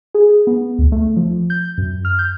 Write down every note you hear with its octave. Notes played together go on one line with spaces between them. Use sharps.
G#4
B3
D2
A3
F3
G6
F#2
F6
G6